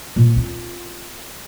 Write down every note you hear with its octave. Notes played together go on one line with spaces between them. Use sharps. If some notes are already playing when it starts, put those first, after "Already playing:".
A#2
C4 F4